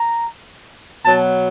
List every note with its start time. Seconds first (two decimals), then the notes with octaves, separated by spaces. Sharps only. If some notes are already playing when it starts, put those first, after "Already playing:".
Already playing: A#5
1.05 B2 F#3 B3 A5